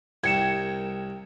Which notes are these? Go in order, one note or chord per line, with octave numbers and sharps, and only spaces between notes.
C2 G4 A#4 G5 G#6 C#7 E7